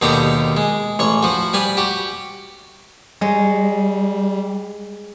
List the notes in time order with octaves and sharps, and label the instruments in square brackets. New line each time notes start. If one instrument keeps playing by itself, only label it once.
[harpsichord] D#2 B2 D3 D#4 G4 A#5
G#3
A1 C#5 C#6
F3 F#4
G3 B4 G#5
F#4 G4
[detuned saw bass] G3 [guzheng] G#3 C#5